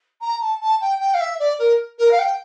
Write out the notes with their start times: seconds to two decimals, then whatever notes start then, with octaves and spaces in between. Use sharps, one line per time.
0.21 A#5
0.41 A5
0.61 A5
0.81 G5
1.00 G5
1.14 F5
1.20 E5
1.40 D5
1.59 A#4
1.98 A#4
2.11 F5
2.19 G5